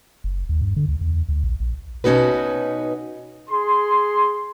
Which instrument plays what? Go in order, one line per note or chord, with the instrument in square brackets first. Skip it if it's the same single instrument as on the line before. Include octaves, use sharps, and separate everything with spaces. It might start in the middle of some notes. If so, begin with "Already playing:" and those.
[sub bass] F#1
D#2
G2
D3
D2
E2
D2
A#1
A#1
[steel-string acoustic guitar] B2 C#4 D#4 F#4 B4
[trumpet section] G#4 C6